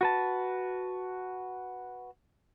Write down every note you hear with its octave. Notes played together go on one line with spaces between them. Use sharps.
F#4 B4 A5